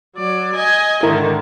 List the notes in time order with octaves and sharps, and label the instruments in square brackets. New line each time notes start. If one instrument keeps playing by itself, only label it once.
[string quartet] F#3 D5
D#5 G#5
[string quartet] G#2 D3 D#3 [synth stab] E4 A#4